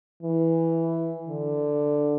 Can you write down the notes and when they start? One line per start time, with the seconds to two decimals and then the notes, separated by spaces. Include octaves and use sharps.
0.23 E3
1.28 D3